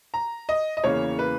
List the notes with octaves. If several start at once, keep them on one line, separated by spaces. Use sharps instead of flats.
A#5
D#5
D#5
E2 C#3 E3 A#3 C#5
B4